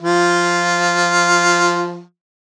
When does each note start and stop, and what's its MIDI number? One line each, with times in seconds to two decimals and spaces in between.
0.02 2.01 53
0.02 2.01 65